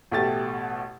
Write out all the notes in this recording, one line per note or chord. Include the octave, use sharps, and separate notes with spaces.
A1 B2 A3 G4 A6